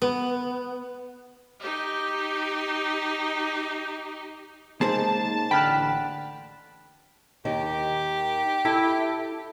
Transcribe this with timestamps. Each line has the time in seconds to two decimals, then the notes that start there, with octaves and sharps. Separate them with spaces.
0.02 B3
1.60 D#4 G4
4.81 C#3 G#3 A#3 D#4 G#4 C5 A5
5.51 A1 D3 G5 B5 F6 F#6
7.45 D#2 D#3 G4
8.65 E4 A4